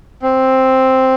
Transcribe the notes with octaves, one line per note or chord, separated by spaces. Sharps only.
C4